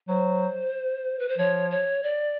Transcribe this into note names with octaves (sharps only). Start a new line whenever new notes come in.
F#3 C5
B4
C5
F3 C#5
C#5
D5